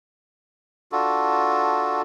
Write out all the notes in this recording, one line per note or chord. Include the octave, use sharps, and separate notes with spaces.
D4 F4 F#4 A4